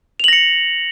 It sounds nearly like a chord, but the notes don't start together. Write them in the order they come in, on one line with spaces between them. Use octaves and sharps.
F7 F#7 A#6 C#7